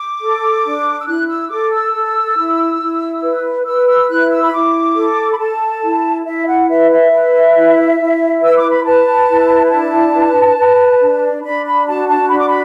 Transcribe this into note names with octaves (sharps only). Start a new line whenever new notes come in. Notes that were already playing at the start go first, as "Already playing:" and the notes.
Already playing: D6
A4
D4
E6
E4 F#6
E6
A4 D6
E6
A4
E4
E4
B4
B4 E6
E6
E4 F#6
E6
B5
E4 D6
A4
B5
A4 A5
E4
E4 E5
F#5
B4 E5
E5
B4
E4
E4
B4 E6
D6
B5
B4 A5
E4
D4 A5
B4
B4
D4
D4 B5
B5
F#4 A5
A5
D4 B5
D6
B5